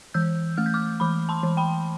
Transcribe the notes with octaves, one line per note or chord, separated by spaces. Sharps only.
E3 E6 G6
A3 F6
G6
D6 F6
E3 B5 D6
A5 C6
E3
G5 B5